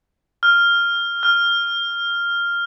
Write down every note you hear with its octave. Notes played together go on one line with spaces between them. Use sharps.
F6
F6